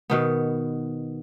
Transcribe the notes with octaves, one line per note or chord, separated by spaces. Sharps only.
B2 D#3 B3